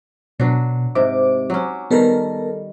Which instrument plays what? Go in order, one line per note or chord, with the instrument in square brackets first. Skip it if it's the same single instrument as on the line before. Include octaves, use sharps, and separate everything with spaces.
[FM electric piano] B2 [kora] F#3 D4
[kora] G#2 C3 [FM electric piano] D6
[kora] F#3 C#4
[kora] D#3 G3 [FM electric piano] B3 A4 A#4